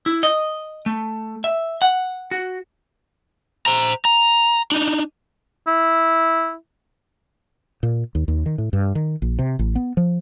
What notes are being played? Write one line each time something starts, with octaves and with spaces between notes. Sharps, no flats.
E4
D#5
A3
E5
F#5
F#4
C5 A#5
A#5
D4 D#4
E4
A#2
D#2
D#2
D#3
A2
G2
D#3
A#1
C3
A1
B3
F3